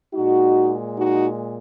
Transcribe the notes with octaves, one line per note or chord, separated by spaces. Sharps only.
A#2 G#3 D#4 F#4
D#4 F#4